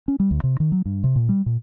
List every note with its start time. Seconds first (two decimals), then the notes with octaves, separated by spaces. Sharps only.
0.08 C#4
0.20 G3
0.31 D2
0.44 C3
0.60 D#3
0.72 F#3
0.86 G2
1.04 C3
1.16 A#2
1.29 G3
1.46 A#2